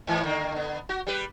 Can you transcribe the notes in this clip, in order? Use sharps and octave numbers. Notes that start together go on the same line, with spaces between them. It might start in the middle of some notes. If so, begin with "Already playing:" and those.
G#2 E3
D3 D#3 A#3
D3 B3
F#4
G3 G4 B4